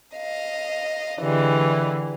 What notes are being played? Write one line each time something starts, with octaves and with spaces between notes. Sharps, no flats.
D#5 F5
D3 E3 G3 G#3